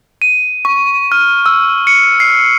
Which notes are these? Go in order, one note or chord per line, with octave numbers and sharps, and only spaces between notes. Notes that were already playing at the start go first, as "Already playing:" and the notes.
D#7
C#6
F6
E6
C#7
C7